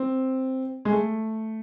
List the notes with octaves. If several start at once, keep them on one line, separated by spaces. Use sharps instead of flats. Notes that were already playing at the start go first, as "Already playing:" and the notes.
Already playing: C4
G#3
A3